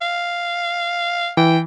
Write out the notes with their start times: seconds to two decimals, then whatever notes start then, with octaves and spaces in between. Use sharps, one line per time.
0.01 F5
1.37 E3 G5